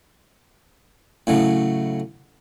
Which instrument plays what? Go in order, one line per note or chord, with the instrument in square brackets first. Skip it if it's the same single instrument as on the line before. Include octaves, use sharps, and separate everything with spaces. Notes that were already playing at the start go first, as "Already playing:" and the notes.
[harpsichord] A2 C#3 F#3